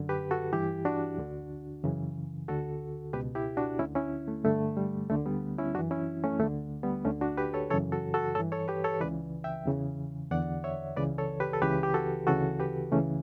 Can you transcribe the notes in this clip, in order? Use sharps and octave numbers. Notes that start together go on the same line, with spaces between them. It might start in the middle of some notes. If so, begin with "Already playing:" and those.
Already playing: F#2 D3
G4 B4
F#4 A4
G2 E3 E4 G4
D4 F#4
D2 D3
F#2 C#3 E3
D2 D3 F#4 A4
C#2 B2 G4 B4
E4 G4
D4 F#4
D2 D3 C#4 E4
C#4 E4
A3
G2 D3 A3
G3
D2 D3 A3
G3 B3
C#4 E4
F#2 E3 D4 F#4
C#4 E4
A3 C#4
D2 D3 A3
G3 B3
D2 D3 A3 C#4
D4 F#4
G4 B4
A4 C#5
F#2 C#3 E3 A4 C#5
F#4 A4
F#4 A4
G2 E3 A4 C#5
A4 C#5
G4 B4
A4 C#5
C#2 C#3 E3 B4 D5
E5 G5
E2 C#3 E3
E2 D3 D5 F#5
C#5 E5
C#2 C#3 E3 B4 D5
A4 C#5
G4 B4
A4
C#2 C#3 E3 G4 B4
G4
F#4 A4
D2 C#3 E3 F#4 A4
G4 B4
C#2 C#3 E3 A3 C#4